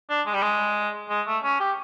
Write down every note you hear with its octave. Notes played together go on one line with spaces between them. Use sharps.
D4
G#3
G3
G#3
G#3
A3
C#4
G4